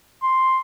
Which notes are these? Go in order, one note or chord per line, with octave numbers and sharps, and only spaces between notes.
C6